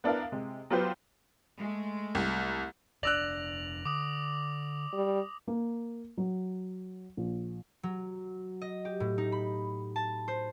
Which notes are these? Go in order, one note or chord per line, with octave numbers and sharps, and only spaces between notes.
B3 D4 E4 A#4 F5
C3 G#3
F#3 B3 F4 G4 B4 C5
G#3 A3
C2
F1 D4 D5 E6 F#6 A#6 F7 F#7
D3 D6 D#6
G3
A#3
F#3
A#1
F#3
D#5
G4
A2
D#4
B5
A5
C5